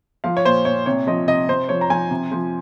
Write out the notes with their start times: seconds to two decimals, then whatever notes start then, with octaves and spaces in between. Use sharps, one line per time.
0.24 F3 F5
0.37 C#5
0.45 A#2 C5
0.65 A#2 C#5
0.86 C3 C#5
1.07 F3 D#5
1.27 C3 D#5
1.49 C3 C5
1.69 F3 C#5
1.81 A#5
1.90 F3 G#5
2.10 C3
2.31 F3